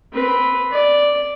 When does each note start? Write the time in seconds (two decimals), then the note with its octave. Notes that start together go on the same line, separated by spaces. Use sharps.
0.12 C4 B4
0.71 D5